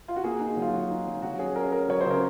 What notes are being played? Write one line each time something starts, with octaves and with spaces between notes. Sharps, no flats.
F4
F#4
A#3 G#4
D#4
F#3 F4
F#3 F#4
D#4
F#3
F#3 F#4
C#4 G#4
C#4 A#4
C#4 A#4
F#3 C#5
C#3 C5
A#4